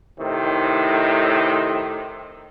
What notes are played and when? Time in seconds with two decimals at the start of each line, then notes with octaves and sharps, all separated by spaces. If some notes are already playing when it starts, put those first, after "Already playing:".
0.20 A2 C3 D#3